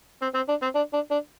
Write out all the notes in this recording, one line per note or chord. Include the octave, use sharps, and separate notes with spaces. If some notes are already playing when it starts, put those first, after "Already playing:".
C4
C4
D4
C4
D4
D4
D4